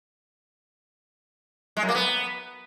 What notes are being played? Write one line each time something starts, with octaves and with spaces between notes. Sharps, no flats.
G#3
F#2
A#3
B3